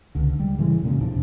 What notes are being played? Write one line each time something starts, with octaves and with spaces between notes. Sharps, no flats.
C#2 D3
G3
A2 C#3 E3 G#3
F#2 A#2 C#3
F2 C3 D4